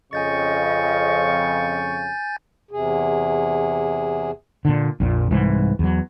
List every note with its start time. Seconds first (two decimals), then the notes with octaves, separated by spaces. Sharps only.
0.13 F2 C#3 D#5 G#5 C#6 G6 A6
2.71 E2 C3 G#4
4.65 A#2 D3
5.00 A#1 F2 A#2
5.31 C2 G#2 E3
5.79 E2 F#3